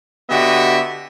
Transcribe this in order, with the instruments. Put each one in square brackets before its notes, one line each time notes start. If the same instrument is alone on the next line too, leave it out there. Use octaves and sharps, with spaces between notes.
[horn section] D3 B3 F#4 G4 D#5 E5